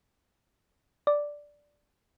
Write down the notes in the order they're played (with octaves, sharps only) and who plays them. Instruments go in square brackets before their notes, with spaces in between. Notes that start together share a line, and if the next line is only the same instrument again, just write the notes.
[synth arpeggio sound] D5